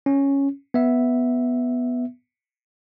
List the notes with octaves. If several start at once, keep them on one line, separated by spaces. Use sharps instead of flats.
C#4
B3 E5